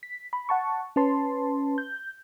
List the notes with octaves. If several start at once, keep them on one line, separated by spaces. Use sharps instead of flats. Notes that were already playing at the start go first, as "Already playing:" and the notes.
B6
B5
F#5 A5 C#6
C#4 B4 A5 C6
G6